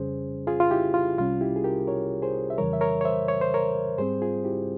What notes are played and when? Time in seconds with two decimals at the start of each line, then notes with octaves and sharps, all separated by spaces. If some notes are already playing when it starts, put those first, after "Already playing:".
Already playing: F2 C#3 G3 C#4 G#4 C5
0.47 F4 G#4
0.60 F4
0.71 E4 G4
0.94 F4
1.18 C2 C3 G3 C#4 F4
1.41 E4 G4
1.56 G#4
1.64 G4 A#4
1.87 A#4 C#5
2.22 G#4 C5
2.50 E5
2.58 F2 C#3 E3 G3 A#4 C#5
2.73 E5
2.81 A#4 C#5
3.01 C#5
3.05 C5 E5
3.28 C#5
3.41 C5
3.54 A#4 C#5
3.98 G#2 G3 C4 G#4 C5
4.22 F4 G#4
4.45 E4 G4